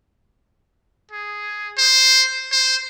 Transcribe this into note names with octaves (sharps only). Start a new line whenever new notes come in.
G#4
C5
C5